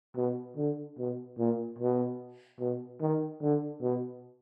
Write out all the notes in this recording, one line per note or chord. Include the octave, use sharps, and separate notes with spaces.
B2
D3
B2
A#2
B2
B2
D#3
D3
B2